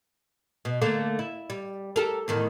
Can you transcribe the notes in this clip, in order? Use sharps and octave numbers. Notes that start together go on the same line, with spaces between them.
B2
D3 A3 A#3
E4
G3
G4 A4 A#4
E2 A2 D#3